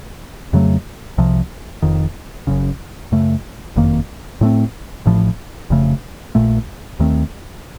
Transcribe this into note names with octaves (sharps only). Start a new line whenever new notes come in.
F2 C#3 F#3 A3
C2 C3 F3
F1 F2 D#3
F#1 F#2 C#3
F#2 C#3 A3
F#1 F2 D#3 A#3
A2 A3 C4
A1 A2 F3
F1 F2 C#3 A3
A#1 A#2 A3
D#2 D#3 A3 C4